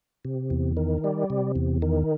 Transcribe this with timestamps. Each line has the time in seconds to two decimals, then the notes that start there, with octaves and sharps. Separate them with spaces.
0.25 C3
0.50 E2
0.77 D#3
1.04 G3
1.30 C3
1.56 E2
1.82 D#3